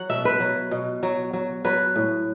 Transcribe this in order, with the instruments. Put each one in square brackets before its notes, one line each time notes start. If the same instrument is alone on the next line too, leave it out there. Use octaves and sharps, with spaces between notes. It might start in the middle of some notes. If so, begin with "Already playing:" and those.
Already playing: [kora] F#3 F#5
B2 E5
B4
F#3
B2
F#3
F#3
F#3 B4
A2